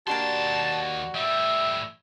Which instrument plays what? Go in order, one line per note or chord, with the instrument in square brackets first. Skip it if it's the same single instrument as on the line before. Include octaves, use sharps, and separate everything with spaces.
[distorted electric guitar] D#2 C6 [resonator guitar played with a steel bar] A#3 D4 G4 [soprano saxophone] F#4 [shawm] A5
[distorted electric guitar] A2 G3 [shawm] E5